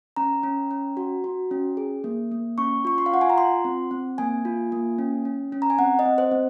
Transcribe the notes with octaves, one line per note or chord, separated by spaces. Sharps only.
C#4 A#5
C#4
C#4
F#4
F#4
C#4
G#4
A#3
A#3
C#4 C#6
F4 C#6
C6
F5
F4 F#5
G#5
A#5
F4 C6
C4
C4
A#3 G#5
F4
A#3
C#4
C#4
C#4
A#5
G#5
C4 F#5
D#5
C4
C5
C4